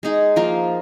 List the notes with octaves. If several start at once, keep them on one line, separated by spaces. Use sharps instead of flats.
G#3 D#4 G#4
F3 A#3 F4 A#4